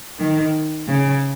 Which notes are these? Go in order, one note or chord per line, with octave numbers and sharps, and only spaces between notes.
D#3
C#3